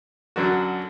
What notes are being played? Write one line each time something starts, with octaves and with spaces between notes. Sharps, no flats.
F#2 D3 F#3 D4 F#4